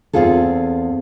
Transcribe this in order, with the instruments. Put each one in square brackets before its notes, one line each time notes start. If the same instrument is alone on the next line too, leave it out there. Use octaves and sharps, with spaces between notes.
[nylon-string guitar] E2 C#3 C4 F4 G#4 A4